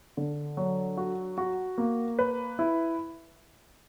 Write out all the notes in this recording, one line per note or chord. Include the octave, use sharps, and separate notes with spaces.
D3
F#3
F#4
F#4
A#3
B4
E4